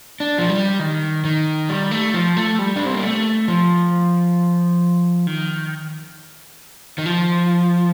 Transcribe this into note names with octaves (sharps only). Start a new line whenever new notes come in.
D4
F3
G3
D#3
D#3
G3
A3
F3
A3
G3
D4
C4
A#3
A3
F3
D#3
D#3
F3